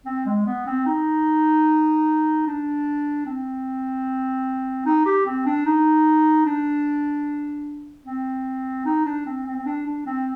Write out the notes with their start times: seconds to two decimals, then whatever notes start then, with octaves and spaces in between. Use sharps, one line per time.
0.06 C4
0.26 G#3
0.46 B3
0.66 C4
0.86 D#4
2.47 D4
3.26 C4
4.86 D#4
5.06 G4
5.26 C4
5.46 D4
5.66 D#4
6.46 D4
8.06 C4
8.85 D#4
9.06 D4
9.26 C4
9.46 C4
9.56 C4
9.66 D4
9.86 D4
10.06 C4